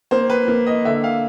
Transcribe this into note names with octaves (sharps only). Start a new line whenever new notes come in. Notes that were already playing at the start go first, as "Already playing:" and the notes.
A#3 C5
B4
A#3
D#5
D3 E5
F5